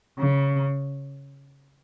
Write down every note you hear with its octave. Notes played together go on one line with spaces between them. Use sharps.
C#3